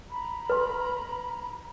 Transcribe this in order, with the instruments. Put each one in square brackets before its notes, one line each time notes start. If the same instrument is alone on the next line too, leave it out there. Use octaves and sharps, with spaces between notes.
[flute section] A#5 B5
[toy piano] B4 C6